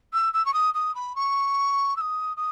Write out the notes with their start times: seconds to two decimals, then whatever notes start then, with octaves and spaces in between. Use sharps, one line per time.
0.13 E6
0.33 E6
0.45 C#6
0.53 D#6
0.74 D#6
0.95 B5
1.15 C#6
1.96 E6
2.01 D#6
2.37 D#6